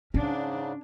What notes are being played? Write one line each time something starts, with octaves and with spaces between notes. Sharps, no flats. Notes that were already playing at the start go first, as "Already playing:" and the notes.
G#2 C#3 C#4 D4